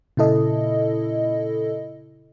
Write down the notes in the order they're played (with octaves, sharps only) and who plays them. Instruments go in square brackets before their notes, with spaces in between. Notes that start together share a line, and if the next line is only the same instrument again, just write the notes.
[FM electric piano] A#2 C#3 E4 A4 D#5